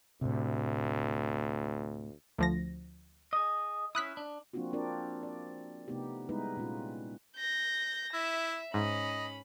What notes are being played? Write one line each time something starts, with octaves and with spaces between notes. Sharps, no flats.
D2 A2 C3
D2 F3 A#6
G#4 D#5
C#4 E4 D#6 F#6 B6
D4
F3 A#3 C4 D4 F4 F#4
C4 D4 F4 A#4 D5
D5
C3 A3 B3 D#4 G4
G3 G#3 B3 D#4 E4 B4
A#2 G#3 C#4 F4
G6 A#6
E4 E5
G#2 C#4 D#5 B5